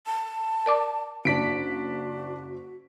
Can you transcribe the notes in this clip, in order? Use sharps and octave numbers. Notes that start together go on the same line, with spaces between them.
A5
A#4 D5 D6
F#1 D4 F#4 B6 D7